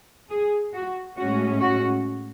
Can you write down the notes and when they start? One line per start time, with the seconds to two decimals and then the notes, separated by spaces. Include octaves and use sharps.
0.30 G#4
0.73 F#4
1.17 A2 G#3 C#4 F#4
1.61 F#4